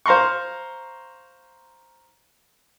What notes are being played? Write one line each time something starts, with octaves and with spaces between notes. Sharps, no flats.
C5 F5 A#5 C6 C#6